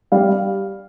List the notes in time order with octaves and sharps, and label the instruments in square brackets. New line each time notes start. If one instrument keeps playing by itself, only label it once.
[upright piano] G3 F5